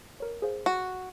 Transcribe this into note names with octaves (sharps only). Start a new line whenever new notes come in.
A#4 C#5
G#4 C5 F5
F#4